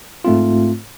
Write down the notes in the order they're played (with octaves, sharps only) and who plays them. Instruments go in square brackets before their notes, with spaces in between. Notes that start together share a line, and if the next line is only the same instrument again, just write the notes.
[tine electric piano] G#2 A3 C4 F4